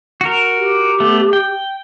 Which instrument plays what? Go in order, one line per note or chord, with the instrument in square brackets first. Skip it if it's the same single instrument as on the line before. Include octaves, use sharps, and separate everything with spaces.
[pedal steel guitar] F#4 A#4
[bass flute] G4
[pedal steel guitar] A3 B3
G5